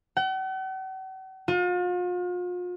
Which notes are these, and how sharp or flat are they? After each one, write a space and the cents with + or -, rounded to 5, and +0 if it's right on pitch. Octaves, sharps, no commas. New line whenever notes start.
F#5 +45
F4 +40